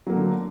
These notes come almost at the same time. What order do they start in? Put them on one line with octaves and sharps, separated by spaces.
F#3 A#3 A3 D3